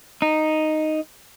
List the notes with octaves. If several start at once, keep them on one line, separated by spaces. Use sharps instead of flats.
D#4